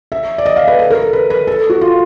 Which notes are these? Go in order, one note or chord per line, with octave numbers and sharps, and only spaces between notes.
E5
D5
D#5
F5
B4
A4
A#4
A4
B4
B4
A4
F#4
F4